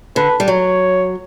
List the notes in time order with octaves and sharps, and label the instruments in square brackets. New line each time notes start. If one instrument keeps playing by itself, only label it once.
[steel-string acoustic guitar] D3 [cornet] B4
[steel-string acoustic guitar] G3
[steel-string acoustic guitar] F#3 [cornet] C#5